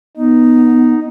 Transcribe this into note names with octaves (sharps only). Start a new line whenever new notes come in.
B3 D#4